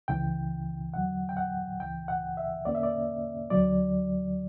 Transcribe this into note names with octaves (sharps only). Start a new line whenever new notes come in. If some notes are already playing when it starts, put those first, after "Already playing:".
C#2 C#3 E3 G5
E2 D3 F#3 F#5
G5
F#5
C#2 C#3 E3 G5
F#5
E5
E2 D3 A#3 C#4 D5
E5
D5
D2 D3 F#3 D5